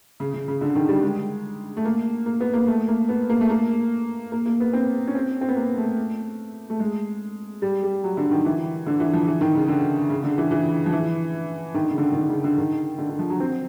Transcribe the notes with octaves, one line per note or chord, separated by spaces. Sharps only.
C#3
C#3
C#3
D3
D#3
G3
G#3
A3
A#3
A#3
B3
A#3
A3
A#3
B3
A#3
A3
A#3
A#3
A#3
B3
C4
C#4
C4
C4
B3
A#3
A3
A3
G#3
G3
G3
F#3
D3
D#3
E3
D3
E3
F3
E3
D#3
C#3
D3
C#3
D3
E3
E3
F3
E3
D#3
D3
C#3
D3
D#3
D3
C#3
D3
D#3
D3
D3
F3
F#3
C4